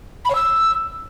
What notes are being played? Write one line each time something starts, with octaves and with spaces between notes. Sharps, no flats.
B5
C#5
E6